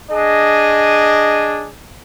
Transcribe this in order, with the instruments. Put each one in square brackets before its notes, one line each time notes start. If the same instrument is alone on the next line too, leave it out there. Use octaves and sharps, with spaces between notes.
[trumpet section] D4 G#4 D#5